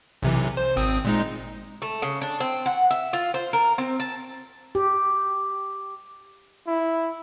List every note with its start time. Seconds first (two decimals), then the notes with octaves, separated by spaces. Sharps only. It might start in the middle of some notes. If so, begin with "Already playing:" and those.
0.23 B1 C3 E3
0.57 C5
0.76 G#1 C4 D#6
1.05 A#2 G#3 D#4
1.82 A3
2.02 C#3
2.21 D4
2.40 C4
2.66 F#5
2.91 E5
3.13 F4
3.34 C5
3.53 A#4
3.78 C4
4.00 A5
4.75 G4
6.67 E4